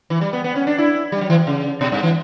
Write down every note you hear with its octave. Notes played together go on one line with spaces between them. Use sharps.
E3
G3
B3
B3
C#4
D4
E4
G3
F#3
E3
C#3
B2
G2
E3